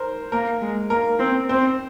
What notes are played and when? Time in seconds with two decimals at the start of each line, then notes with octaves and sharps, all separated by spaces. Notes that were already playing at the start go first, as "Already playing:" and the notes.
Already playing: A#4 C5
0.32 A#3 A#4
0.62 G#3
0.90 A#3 A#4
1.20 C4
1.49 C4 C5